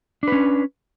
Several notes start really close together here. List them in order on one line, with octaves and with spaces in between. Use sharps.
D4 B4 C#4